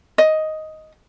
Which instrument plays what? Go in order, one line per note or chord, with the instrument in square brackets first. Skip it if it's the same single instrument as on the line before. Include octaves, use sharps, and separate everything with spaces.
[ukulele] D#5